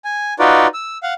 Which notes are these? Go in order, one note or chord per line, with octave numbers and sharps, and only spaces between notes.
G#5
D#4 F4 F#4 B4 D5
E6
F5 F#5